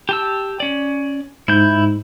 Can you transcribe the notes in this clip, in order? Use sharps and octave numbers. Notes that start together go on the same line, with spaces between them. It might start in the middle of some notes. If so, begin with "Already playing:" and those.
G4 A5 E6
C#4 D5
G#2 E4 G6